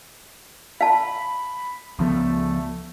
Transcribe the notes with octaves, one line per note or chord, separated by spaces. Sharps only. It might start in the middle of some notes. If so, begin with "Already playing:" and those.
F5 A5 B5
C#2 F3 A3 B3